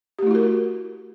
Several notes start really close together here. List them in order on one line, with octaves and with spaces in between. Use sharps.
G4 A3 E4 F#4 A#4